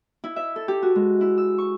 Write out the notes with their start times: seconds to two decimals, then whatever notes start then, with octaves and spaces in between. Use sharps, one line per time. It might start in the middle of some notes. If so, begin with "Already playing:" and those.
0.24 E4
0.36 E5
0.56 A4
0.68 G4
0.82 F#4
0.95 G#3
1.21 E4
1.38 E6
1.58 C#6